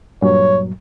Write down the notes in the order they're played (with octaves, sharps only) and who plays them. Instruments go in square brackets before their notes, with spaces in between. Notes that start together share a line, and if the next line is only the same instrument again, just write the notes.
[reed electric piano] G2 A#2 F#3 [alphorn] C#5